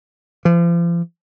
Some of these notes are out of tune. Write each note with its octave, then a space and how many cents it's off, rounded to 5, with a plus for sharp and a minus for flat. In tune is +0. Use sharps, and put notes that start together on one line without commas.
F3 -40